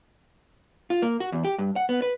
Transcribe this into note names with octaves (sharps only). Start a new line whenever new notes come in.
F4
A#3
F#4
E2
G4
G2
F#5
B3
B4